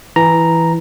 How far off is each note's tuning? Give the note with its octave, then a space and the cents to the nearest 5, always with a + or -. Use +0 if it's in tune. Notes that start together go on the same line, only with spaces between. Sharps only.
E3 +0 A#5 +0